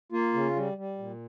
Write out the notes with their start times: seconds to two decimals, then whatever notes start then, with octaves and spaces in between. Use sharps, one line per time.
0.12 A#3 F4
0.34 C#3
0.56 G3
0.78 G3
0.98 A#2